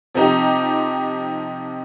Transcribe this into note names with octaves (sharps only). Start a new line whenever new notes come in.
C3 F3 C4 D#4 G4